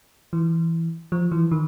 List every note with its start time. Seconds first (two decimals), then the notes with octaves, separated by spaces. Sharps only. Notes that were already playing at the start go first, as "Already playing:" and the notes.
0.33 E3
1.12 F3
1.32 E3
1.51 D#3